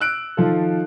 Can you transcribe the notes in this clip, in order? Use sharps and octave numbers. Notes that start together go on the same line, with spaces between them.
E6 F#6 D7
D#3 F3 F4 A4